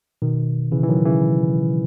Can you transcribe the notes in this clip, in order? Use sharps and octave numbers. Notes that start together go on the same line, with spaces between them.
B2 D#3
C#3 E3
E3
D#3 F#3
C#3 E3